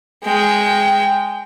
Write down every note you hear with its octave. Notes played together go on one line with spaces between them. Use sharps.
G#3 G5